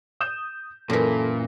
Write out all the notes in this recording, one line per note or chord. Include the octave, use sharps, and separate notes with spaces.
D#6 G6 E7
F#2 A#2 E3 A4 A#6 B6